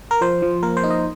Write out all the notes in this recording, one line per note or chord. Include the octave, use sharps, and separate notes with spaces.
A#4
F3 C5
F3
A#3 A#4
C5
D#4
D#5